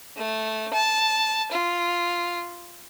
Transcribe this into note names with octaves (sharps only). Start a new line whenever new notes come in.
A3
A5
F4